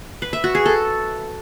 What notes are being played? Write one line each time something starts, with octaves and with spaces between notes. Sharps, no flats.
B4
E5
F#4
G#4
A4